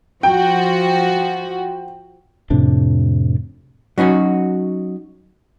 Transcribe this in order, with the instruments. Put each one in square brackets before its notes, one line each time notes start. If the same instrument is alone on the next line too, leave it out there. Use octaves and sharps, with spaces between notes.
[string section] F3 F#4 [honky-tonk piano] G5
[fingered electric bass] F2 A2 C3 D4
[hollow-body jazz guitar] F#3 C#4 D#4 F#4